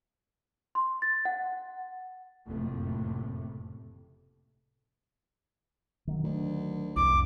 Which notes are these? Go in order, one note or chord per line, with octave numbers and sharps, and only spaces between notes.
C6
A6
F#5
F#1 F2 A2 C3 A3
D#3 F#3
D2
C2 F2 D6